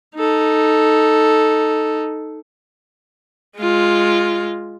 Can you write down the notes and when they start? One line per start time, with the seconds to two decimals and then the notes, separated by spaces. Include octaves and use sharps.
0.15 D#4 A4
3.59 G#3 F4